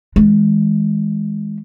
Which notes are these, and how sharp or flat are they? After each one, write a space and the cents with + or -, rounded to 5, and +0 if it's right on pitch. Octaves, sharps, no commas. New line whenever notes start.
E3 -35 G#3 +0